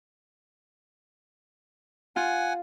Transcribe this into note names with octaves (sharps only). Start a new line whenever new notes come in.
F4 F#5 G#5